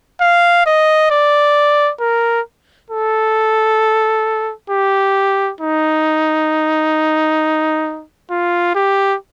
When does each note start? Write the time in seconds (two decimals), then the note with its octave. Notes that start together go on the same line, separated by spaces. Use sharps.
0.21 F5
0.66 D#5
1.11 D5
2.00 A#4
2.91 A4
4.70 G4
5.61 D#4
8.31 F4
8.75 G4